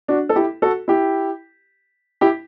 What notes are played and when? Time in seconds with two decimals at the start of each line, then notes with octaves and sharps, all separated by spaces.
0.08 D4 F#4
0.29 A4
0.36 E4 G4
0.62 F#4 A4
0.88 E4 G4
2.21 E4 G4